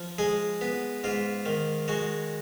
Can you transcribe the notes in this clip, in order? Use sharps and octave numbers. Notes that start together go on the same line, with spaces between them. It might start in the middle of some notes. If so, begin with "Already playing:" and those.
Already playing: F3
G#3 G#4
B3
G#2 F4
D#3
G#3 F#4